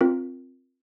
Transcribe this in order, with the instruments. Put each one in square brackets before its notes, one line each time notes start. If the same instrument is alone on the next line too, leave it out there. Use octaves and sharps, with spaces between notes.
[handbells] C4 F4 A#4